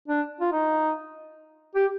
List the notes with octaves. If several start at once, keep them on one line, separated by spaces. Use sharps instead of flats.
D4
F4
D#4
G4